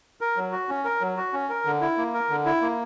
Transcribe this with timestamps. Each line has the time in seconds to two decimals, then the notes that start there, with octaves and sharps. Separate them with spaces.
0.21 A#4
0.36 F#3
0.52 F#4
0.69 C#4
0.84 A#4
1.01 F#3
1.17 F#4
1.33 C#4
1.49 A#4
1.65 D3
1.81 E4
1.97 A#3
2.14 A#4
2.30 D3
2.45 E4
2.61 A#3